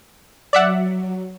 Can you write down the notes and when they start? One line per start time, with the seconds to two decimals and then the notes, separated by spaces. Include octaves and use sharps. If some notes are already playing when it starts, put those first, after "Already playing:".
0.53 F#3 D5 E5 F#5